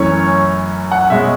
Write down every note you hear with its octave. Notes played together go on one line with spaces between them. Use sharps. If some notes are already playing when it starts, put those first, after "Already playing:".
Already playing: F#2 E3 A3 C#4 C#5
F#5
B2 G#3 C#4 E5